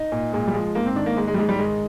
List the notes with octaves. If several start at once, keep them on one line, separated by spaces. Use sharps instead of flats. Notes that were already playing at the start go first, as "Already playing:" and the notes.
Already playing: D#4
A#2
A#2 G#3
G3
F3 G#3
G#2 A#3
C4
D#3 D4
A#3
G#2 G#3
G#3
G3
G#2 G#3
G3
D#3 G#3